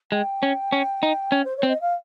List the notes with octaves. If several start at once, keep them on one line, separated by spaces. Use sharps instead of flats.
G#3 G5
C#4
C#4
D#4
C#4
C5
C#5
C4
D#5
F5